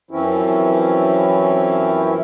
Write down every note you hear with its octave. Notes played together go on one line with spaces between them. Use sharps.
F#2 E3 F3 C4 C#4 E4